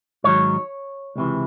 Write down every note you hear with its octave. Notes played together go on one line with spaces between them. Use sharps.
G#2 D#3 F#3 C#5
C#2 C3 E3